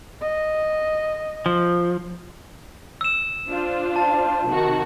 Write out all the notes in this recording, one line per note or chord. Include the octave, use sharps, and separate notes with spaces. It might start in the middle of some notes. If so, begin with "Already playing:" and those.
D#5
F3
E6 E7
D4 F4 C5
A5
C3 D#3 F#4